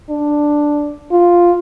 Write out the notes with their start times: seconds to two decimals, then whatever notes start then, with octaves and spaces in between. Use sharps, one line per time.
0.10 D4
1.12 F4